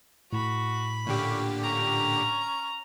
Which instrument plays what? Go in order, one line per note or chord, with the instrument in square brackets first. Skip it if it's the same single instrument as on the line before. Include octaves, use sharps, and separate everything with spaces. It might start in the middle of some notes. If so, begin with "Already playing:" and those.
[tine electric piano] A2 [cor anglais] F#4 [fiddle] B5
[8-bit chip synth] A#2 D3 G4 [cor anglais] C#4
[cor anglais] C#4 [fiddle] A#5